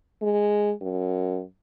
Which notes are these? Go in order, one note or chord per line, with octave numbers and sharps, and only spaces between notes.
G#3
F#2